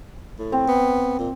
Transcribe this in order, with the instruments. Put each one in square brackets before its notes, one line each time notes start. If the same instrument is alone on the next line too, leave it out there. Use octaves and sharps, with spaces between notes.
[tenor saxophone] A2
[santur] C4
[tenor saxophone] B3
A#2